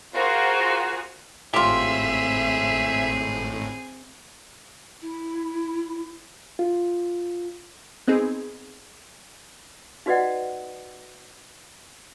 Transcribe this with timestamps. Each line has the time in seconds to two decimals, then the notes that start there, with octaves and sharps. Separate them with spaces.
0.14 F4 F#4 G#4 A#4 C5 F5
1.54 G#1 A2 C4 F4 G4 G#4 E5
5.02 E4
6.59 F4
8.07 B3 C4 D#4 G#4
10.06 D#4 F#4 B4 D5 D#5 F#5